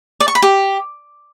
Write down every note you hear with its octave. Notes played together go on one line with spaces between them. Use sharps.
D5
C#6
B5
G4